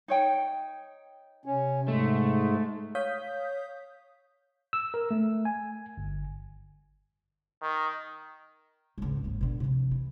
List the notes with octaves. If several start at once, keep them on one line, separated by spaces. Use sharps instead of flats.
D#4 C#5 G5
C3 C#4
G#2 G#3 A3
C#5 F5 D#6 G6 B6
E6
A#4
A3
G#5
G1
D#3
G#1 C#2
G#1 D#2
B2 D3
C3 F3
E3